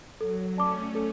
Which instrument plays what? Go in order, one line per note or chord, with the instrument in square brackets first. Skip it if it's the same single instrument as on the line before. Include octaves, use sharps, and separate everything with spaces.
[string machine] F#3 [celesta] A4
[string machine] A3 C#4 [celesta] D5 A5 D6
[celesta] A4